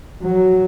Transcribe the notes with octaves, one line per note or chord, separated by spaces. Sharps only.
F#3